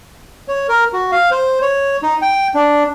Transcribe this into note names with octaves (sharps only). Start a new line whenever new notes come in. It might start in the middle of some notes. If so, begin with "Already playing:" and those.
C#5
A#4
F#4
F5
C5
C#5
D#4
G5
D4